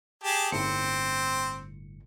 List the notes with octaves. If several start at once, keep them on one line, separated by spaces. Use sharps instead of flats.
G4 G#4 A5
G1 A2 C4 C#7